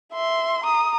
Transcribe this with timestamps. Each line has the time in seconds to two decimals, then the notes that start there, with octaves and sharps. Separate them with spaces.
0.13 E5 C6
0.64 A#5 D#6